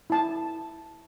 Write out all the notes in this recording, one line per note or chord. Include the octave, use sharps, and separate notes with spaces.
E4 A5